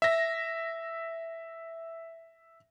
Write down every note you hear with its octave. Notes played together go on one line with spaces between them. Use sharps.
E5 A#6